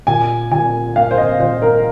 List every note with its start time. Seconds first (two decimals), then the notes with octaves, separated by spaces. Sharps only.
0.07 A#2 G#5
0.52 A#2 G#5
0.96 A#3 F5
1.11 C5
1.18 D#5
1.39 A#2 C5
1.62 A#4